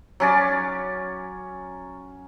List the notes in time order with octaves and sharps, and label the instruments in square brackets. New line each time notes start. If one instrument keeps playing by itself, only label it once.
[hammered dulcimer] F#3 C#4 D5